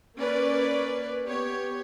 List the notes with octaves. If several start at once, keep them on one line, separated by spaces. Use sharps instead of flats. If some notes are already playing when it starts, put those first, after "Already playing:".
A#3 C#4 B4 D5
B3 G4 C#5